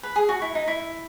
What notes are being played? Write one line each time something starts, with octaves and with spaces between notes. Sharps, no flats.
B4
G#4
F#4
E4
D#4
E4